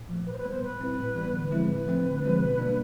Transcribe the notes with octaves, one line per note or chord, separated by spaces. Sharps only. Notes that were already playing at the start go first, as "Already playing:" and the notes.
Already playing: A#2
F3 A3
D#3 B4
C5
B4
G3 B3
C5
A#2 B4
G3 C4 E4
A2
E3 G3 B3
D3
F3 G#3 C4 E4
A2 B4
F3 A3 C4
D3
F3 G#3 C4
B2
G3 A#3 D4